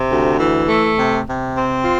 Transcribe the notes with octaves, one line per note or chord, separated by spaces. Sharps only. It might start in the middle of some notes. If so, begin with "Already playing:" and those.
Already playing: C3
D2
E3
A3
C3
C3
C4
F4